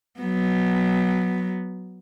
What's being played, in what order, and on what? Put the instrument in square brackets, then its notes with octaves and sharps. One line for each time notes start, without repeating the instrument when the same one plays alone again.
[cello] F#3 B3